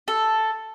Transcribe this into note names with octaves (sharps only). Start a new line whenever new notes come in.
A4